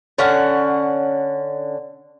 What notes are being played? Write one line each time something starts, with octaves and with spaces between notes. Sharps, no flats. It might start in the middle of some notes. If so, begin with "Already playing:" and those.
D3 C#4 F#5